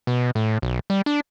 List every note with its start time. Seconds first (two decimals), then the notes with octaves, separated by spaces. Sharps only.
0.07 B2
0.35 A2
0.62 B1
0.90 G3
1.06 D4